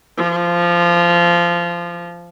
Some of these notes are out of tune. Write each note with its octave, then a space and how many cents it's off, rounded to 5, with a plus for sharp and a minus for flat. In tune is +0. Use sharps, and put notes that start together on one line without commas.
F3 -15